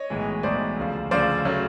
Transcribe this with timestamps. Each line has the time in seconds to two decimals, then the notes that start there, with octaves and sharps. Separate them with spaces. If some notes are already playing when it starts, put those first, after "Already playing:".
Already playing: C#5 D#5
0.10 B1 A2 E3 G#3
0.43 B1 A2 E3 G#3 C5 D5
0.77 D2 C#3 F3
1.11 D2 C#3 F3 C5 D5
1.45 C#3 F#3 A3